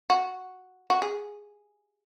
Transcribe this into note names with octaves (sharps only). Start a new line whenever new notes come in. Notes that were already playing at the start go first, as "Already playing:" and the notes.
F#4
F#4
G#4